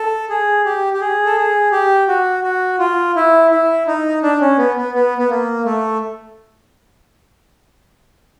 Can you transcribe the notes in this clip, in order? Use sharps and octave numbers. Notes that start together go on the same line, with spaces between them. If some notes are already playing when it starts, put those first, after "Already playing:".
Already playing: A4
G#4
G4
G4
G#4
A4
G#4
G4
F#4
F#4
F4
E4
E4
D#4
D4
C#4
B3
B3
B3
B3
A#3
A3